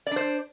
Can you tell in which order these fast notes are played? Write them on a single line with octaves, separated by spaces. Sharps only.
D5 D4 C5